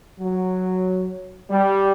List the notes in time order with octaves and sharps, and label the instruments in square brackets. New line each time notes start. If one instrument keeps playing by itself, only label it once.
[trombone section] F#3
G3